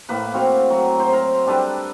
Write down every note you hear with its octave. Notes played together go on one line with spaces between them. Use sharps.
A2 A#3 B4
C4 F#4 F5
F#3
C5
A#4 C5 A#5 C6
G3 D4 A4 B4